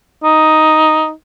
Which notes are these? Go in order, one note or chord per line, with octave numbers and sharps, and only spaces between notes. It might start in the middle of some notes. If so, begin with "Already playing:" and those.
D#4